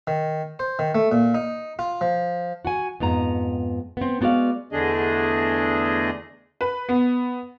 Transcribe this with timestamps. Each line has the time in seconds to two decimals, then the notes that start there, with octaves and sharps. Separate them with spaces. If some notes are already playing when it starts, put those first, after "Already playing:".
0.07 D#3
0.59 C5
0.79 D#3
0.95 A3
1.11 A#2
1.34 D#4
1.79 F4
2.01 F3
2.65 F#4 F#5 G#5
3.00 F2 G#2 B3 A#5
3.97 B3 C4
4.21 G#3 B3 F#4 D5 F5
4.71 E2 D3 A3 D4 G#4 D#5
6.61 B4
6.89 B3